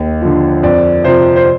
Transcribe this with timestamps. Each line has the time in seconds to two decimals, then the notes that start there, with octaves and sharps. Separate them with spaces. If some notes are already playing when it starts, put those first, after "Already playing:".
Already playing: D#2 D#5
0.21 D3 F3
0.63 F2 D5
1.04 C3 F3 C5
1.36 C5